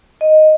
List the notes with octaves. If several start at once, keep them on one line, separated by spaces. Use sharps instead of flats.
D#5